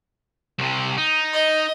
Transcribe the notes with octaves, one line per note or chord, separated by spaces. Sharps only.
C2 C3
D#4
D#5